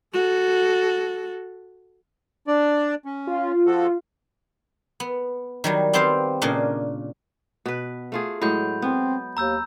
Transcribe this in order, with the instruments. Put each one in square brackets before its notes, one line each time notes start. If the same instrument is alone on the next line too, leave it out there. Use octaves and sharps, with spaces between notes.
[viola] F#4 A4
[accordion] D4 D5
C#4
[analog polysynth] F4
[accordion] F3 F#4 A4
[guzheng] B3
D#3 F#3 G3
B3 C4 G4 C5 F5
A#2 C#3 A#3 D4 D#5
[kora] B2 B4
A3 F4 G#4
[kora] A2 F#3 G#3 [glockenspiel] B5 G6
[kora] B3 [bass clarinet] C4
[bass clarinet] D#2 [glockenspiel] A#5 E6 G6